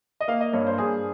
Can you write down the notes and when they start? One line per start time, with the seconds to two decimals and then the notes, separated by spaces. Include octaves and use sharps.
0.21 D#5
0.28 A#3 F5
0.41 D#5
0.53 G2 C#5
0.67 C5
0.78 G2 G#4